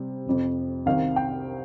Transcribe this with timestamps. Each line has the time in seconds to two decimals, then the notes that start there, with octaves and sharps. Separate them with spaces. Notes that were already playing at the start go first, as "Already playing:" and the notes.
Already playing: C3 G3
0.26 F1 F2 C3
0.86 C2 C3 D#3 F5
1.16 G5